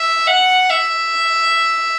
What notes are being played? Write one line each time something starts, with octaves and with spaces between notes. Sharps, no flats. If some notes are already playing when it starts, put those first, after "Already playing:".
Already playing: E5
F#5
E5